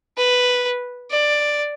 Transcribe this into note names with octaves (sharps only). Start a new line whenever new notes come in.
B4
D5